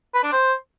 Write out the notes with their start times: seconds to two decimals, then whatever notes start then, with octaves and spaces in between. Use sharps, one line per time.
0.14 B4
0.23 D4
0.32 C5